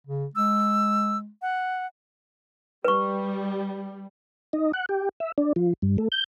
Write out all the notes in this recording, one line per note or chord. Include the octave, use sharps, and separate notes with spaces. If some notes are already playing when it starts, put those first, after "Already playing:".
C#3
G#3 E6
F#5
G3 B4 C#6
D#4
F#5
G4
E5
D4
F3
G2
A3
G6